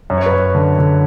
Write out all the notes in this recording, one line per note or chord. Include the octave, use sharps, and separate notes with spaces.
F#2
C#5
B4
F#2 C#5
D3
D3